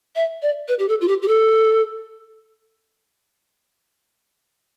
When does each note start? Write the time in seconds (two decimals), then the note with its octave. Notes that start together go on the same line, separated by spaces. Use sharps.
0.16 E5
0.42 D5
0.68 B4
0.79 G4
0.89 A4
1.01 F4
1.08 G4
1.22 G4
1.28 A4